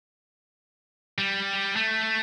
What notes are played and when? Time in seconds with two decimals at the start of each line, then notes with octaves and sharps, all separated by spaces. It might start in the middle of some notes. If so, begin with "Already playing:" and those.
1.18 G3
1.76 A3